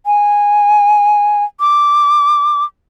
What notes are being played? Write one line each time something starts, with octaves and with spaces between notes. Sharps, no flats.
G#5
D6